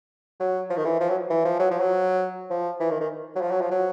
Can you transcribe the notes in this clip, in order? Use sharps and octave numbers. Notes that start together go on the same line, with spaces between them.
F#3
F3
D#3
E3
F3
F#3
E3
F3
F#3
F3
F#3
F3
E3
D#3
D#3
F#3
F3
F#3
F3
F#3